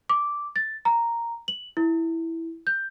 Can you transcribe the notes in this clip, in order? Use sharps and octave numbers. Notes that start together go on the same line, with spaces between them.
D6
A6
A#5
F#7
E4
G6